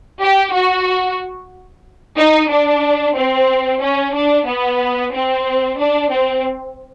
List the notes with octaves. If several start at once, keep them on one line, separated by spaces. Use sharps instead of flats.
G4
F#4
D#4
D4
C4
C#4
D4
B3
C4
D4
C4